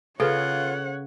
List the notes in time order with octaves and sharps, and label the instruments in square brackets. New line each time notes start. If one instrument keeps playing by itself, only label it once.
[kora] C#3 [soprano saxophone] F4 [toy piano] A4 B4 [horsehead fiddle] C#5 F#5